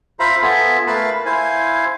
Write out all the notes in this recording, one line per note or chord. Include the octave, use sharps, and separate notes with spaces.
F4 C5 E5 F5 A#5 B5
B3 F4 A4 E5 G#5 A5
A3 A#4 B4 F5 A5 B5
E4 C5 F5 G#5